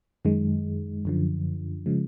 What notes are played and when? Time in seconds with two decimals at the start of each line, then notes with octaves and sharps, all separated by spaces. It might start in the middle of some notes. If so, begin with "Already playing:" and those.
0.25 F#2 D#3 G#3
1.05 F#2 D3 F3
1.86 C#3 F3 G#3